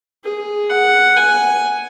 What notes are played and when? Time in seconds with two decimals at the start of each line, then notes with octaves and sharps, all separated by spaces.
0.24 G#4
0.70 F#5
1.17 G#5